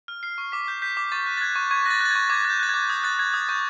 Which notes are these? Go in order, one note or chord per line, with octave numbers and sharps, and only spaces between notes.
F6
F6 C7
C#6
D6 B6
G6
G6 B6
D6
C#6 A6
F#6
A6
F#6 G#6
C#6
C#6 G#6
F#6 A6 A#6
F#6 A6
G#6
C#6
D6 G#6
F#6
G6
F#6 A6
G#6
D6
D#6 G#6
F#6 A6
F#6 G#6
D#6 G#6
C#6 G6